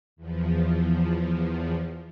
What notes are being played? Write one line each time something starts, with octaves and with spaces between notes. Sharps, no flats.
E2 F3